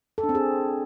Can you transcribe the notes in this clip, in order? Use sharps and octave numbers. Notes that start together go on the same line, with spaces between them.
A4
D4
C4
G#4